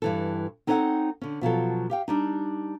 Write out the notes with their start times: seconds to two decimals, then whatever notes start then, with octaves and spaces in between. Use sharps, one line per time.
0.02 G2 E3 A4
0.67 C4 D#4 A4 C#5 E5 F#5
1.21 D3 C#4
1.41 B2 F3 F#3 A4
1.90 G4 F5 G5
2.08 G3 D4 D#4